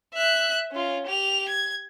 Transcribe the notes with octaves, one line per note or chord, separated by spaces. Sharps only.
E5 F#6
C#4 F4
G4 F7
G#6